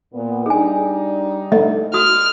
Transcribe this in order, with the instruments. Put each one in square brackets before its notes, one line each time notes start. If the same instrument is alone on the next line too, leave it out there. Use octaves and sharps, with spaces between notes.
[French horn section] A#2 B3
[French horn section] G3 D4 D#4 [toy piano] G#4 G#5
[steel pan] A3 [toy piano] D#5
[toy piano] F#4 D#6 [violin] F6